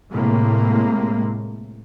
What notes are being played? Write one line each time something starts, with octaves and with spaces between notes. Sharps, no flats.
A2 C3 G#3 A#3